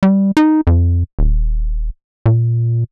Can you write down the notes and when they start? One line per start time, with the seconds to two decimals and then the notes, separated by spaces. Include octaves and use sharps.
0.03 G3
0.37 D#4
0.67 F2
1.19 D#1
2.26 A#2